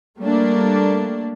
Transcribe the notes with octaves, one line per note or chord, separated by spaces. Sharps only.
G3 A3 A#3 D4